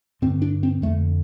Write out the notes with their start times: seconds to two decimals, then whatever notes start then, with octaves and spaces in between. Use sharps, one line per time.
0.22 G2 D3 C4
0.42 D4
0.63 C4
0.82 F2 D3 A3